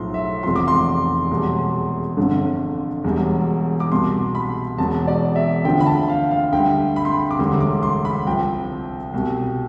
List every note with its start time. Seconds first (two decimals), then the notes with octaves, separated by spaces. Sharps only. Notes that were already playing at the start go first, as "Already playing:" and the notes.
Already playing: B1 A2 F3 C6
0.14 E5
0.43 F1 E2 C3 F3 C6
0.56 D6
0.68 C6
1.30 E1 E2 B2 G3
2.17 G1 F2 D3
3.04 E1 E2 B2 G3
3.80 D6
3.91 C2 B2 G3 C6
4.35 B5
4.78 E1 E2 B2 A5
5.07 D5
5.36 E5
5.65 D2 D3 F3 G5
5.80 B5
5.86 A5
6.09 F5
6.31 F5
6.53 D2 D3 G3 G5
6.96 B5
7.05 C6
7.14 B5
7.31 D6
7.39 E1 D2 D3 G3 C6
7.60 D6
7.83 C6
8.05 B5
8.26 C2 C3 F3 G5
9.13 C2 B2 G3